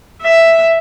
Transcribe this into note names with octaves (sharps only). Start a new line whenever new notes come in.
E5